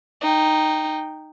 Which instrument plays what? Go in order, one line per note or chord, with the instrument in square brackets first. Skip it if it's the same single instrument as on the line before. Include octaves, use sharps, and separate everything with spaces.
[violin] D#4 G5